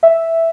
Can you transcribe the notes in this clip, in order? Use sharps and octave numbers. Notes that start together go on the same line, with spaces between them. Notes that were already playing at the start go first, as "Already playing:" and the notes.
E5